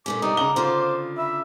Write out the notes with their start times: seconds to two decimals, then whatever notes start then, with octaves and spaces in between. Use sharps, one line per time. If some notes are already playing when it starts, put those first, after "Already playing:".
0.06 A#2 A3 C#4 D6
0.22 C3 G3 D4 D#4
0.37 C#3 F#5 A#5 G7
0.56 D3 F4 C5
1.18 E5 B5